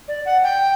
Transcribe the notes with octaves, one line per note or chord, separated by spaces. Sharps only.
D5
F#5
G5